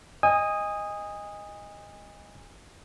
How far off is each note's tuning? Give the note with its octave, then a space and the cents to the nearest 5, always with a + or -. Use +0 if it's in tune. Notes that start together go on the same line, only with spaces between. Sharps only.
D#5 +0 G#5 -30 D#6 +0